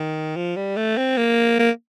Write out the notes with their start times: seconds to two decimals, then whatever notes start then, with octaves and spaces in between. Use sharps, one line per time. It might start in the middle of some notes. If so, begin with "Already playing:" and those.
Already playing: D#3
0.36 F3
0.56 G3
0.76 A3
0.97 C4
1.17 A#3
1.59 A#3